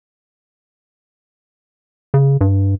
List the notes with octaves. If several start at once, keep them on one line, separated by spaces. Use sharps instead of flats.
C#3
G2